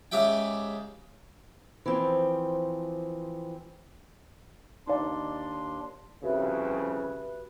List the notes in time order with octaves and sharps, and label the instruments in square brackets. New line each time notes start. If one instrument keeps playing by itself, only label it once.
[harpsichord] G#2 C#3 G4 E5 G5
[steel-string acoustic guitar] E3 F3 C4
[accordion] D#2 D4 C6 [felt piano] D#4 D5
[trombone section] C2 F2 C#3 [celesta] F#4 G4 E5 [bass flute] B4